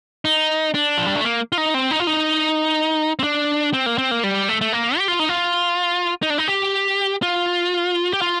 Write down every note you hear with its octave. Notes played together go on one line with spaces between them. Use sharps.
D#4
D4
F3
G3
A3
A#3
F4
D#4
C4
D#4
F4
D#4
C4
D4
C4
A#3
C4
A#3
G3
A3
A3
A#3
G4
F4
D#4
F4
D#4
D4
D#4
G4
F4
G4
F4